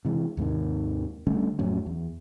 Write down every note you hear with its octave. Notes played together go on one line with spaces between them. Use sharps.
C3 E3 G#3
D#2 G#2 C3 D#3
D3 G3 A3 C#4
F2 A2 F#3 C#4
E2